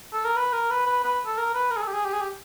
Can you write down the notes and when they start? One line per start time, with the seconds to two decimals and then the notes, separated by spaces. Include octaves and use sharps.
0.13 A4
0.24 A#4
0.36 B4
0.53 A#4
0.70 B4
0.86 B4
1.04 B4
1.26 A4
1.37 A#4
1.54 B4
1.71 A#4
1.77 G#4
1.82 A4
1.88 G4
1.94 G#4
2.05 G4
2.13 G#4
2.21 G4